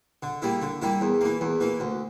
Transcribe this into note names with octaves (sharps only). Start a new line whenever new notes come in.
D3
G3 A#3 E4
D3
G3 A#3 E4
E2
E3 A#3
E2
E3 A#3
D2